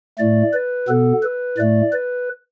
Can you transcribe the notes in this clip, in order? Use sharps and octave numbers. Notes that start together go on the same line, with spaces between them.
A2 A3 D5
B4
B2 B3 A4
B4
A2 A3 D5
B4